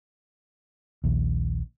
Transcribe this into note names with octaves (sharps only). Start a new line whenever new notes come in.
A#1 D#2